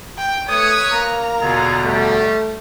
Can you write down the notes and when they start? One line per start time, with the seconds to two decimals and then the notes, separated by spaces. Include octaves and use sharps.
0.18 G5
0.49 A3 B4 C#5 D#6
0.93 A#3 A#5
1.42 E2 B2 D3 F4 G#4 A4
1.85 G3 A3